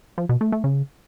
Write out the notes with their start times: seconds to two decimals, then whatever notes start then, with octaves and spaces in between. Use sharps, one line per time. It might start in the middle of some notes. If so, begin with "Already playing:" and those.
0.18 F3
0.29 B2
0.41 A3
0.52 A3
0.64 C#3